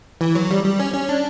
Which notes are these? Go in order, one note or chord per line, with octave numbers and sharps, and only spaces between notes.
E3
F#3
G3
G3
C#4
C#4
D4